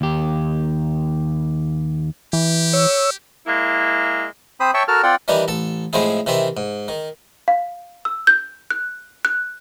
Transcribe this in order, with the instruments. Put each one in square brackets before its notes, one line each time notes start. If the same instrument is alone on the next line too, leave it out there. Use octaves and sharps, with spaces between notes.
[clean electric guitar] D#2 G4
[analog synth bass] E3 [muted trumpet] G4
[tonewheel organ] C#5 E6
[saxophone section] G#3 A#3 E4
[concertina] C4 C5 B5 D#6
C#5 E5 G5 A5 C#6
F#4 A4 A#4 A5 F6
C4 F4 D5 F#5 G5
[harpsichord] D#3 E3 G3 D4 D#4
A1 A4 A5
A2 F3 G#3 C4 E4 G#4
C3 D#3 E3 C4 E5
G#2
D#3
[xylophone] F5
E6
G6
F#6
F#6